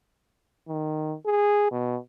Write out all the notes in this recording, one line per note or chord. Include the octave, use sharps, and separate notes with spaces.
D#3
G#4
B2